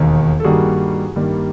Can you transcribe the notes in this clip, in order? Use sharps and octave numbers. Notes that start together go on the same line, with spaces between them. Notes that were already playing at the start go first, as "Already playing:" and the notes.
Already playing: E1 D#2 D#3
A4
G2 D#3 G3 A#3 F#4 G#4
G2 D#3 G3 A#3